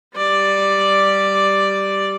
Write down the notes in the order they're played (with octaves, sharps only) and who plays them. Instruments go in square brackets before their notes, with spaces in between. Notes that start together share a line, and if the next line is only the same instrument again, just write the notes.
[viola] G3 D5